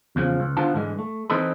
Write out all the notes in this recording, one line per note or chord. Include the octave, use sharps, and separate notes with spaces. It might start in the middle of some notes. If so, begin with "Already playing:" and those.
E2 C#3 F3
C#2
D3 B3 D4 F4 C5 A5
G#2 D3 E3 G#3
A3
E3 C4 D#4 A4 B4